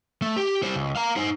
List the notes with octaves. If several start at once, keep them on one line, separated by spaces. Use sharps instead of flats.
A3
G4
G3 C5
C#2
F5 A#5
D#4 C5